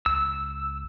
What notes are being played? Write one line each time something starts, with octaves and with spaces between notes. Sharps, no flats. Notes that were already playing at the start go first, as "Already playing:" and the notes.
C#2 E6